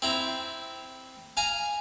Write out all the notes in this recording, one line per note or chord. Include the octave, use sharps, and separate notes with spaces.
C4 E4 A#5
F5 G#5 A#5